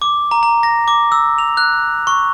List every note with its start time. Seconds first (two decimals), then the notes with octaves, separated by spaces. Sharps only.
0.02 D6
0.31 A#5
0.43 A#5
0.63 A#6
0.88 D6
1.12 E6
1.38 F7
1.57 F#6
2.07 C#6